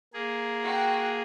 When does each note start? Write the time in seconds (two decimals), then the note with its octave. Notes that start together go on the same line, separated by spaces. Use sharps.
0.14 A#3 G#4
0.63 F#4 G5